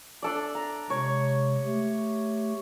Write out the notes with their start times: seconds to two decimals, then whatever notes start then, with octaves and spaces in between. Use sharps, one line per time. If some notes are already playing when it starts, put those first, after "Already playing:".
0.23 D4 A4 D5
0.55 A#5
0.90 C3 G#3 C#5
1.64 A3 G4